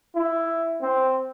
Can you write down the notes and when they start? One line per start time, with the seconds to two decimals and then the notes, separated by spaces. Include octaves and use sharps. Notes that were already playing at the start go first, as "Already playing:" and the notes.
0.16 E4
0.81 C4